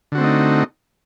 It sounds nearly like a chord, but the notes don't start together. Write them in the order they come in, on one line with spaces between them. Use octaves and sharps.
D3 F#4 C4 A3 D#4